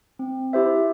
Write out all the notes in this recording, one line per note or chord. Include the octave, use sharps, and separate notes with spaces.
C4
E4 G4 C5 E5